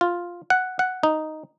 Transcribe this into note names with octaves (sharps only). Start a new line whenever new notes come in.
F4
F#5
F#5
D#4